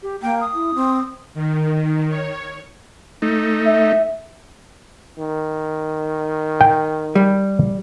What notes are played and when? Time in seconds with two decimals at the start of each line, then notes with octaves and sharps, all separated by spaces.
0.03 G4
0.22 A#3 G5
0.41 D#6
0.54 E4
0.75 C4
1.34 D#3
2.09 C#5
3.22 A3 D#4
3.65 E5
5.18 D#3
6.61 G5
7.15 G3